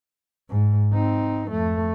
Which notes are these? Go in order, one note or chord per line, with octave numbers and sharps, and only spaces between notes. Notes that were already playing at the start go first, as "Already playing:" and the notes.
G#2
C4 D#4
F2 A3